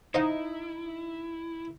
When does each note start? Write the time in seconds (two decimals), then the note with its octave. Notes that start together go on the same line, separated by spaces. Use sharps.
0.14 D#4 E4 C5 F5 F#5